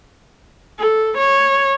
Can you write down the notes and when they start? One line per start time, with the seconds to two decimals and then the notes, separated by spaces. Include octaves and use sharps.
0.79 A4
1.17 C#5